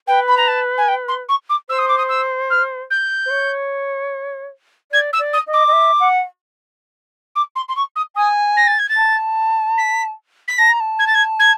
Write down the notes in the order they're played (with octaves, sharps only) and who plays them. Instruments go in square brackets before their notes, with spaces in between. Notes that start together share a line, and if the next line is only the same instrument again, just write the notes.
[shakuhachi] B4 [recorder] G5
[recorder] B5
A#5
A5
G#5
G5
C6
C#6
D6
[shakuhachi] C5 [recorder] E6
[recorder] D#6
D6
D#6
E6
F6
G6
[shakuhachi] C5
C#5
[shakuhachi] D5 [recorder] G#6
[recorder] E6
[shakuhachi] D5
[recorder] D#6
[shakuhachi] D#5
[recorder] D6
[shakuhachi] D#5
E5
F#5
[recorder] D6
C6
C6
C#6
D#6
[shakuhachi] G#5 [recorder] D#6
[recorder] A#6
A6
G#6
A6
[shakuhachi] A5
[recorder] B6
B6
[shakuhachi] A5 [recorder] A#6
[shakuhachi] A#5
A5
[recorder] G#6
A6
G#6
G#6